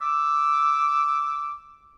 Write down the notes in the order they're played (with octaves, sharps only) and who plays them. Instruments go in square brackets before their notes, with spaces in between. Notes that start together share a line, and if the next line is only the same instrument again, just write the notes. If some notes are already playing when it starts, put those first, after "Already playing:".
[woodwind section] D6 E6